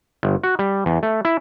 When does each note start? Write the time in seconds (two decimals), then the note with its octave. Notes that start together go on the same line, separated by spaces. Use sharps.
0.23 G1
0.43 F#4
0.59 G3
0.86 E2
1.03 A3
1.25 E4